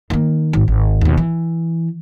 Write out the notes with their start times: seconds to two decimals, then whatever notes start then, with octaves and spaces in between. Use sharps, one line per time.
0.10 D#3 A#3
0.53 G#1
0.68 G#1
1.01 D#2 B2
1.18 E3